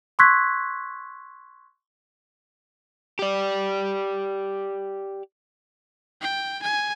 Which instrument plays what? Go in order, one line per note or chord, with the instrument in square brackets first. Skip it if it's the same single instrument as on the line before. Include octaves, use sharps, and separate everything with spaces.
[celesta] C6 C#6 E6 F#6 G#6 B6
[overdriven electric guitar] G4 D5
[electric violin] G5
G#5